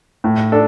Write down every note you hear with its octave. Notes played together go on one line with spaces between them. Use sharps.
A2
D4 A4